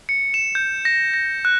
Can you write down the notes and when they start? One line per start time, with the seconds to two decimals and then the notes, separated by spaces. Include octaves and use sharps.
0.09 C#7
0.34 E7
0.55 G6
0.85 A#6
1.14 A#6
1.45 F#6